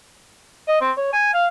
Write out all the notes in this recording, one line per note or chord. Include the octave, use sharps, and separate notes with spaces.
D#5
C4
C#5
G#5
F5